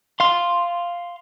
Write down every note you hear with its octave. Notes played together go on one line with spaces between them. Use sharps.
F5 C6